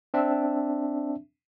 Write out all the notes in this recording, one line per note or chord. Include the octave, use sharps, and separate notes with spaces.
C4 D4 E5